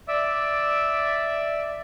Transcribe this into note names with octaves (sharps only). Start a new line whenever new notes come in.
D5 E5 D6 E6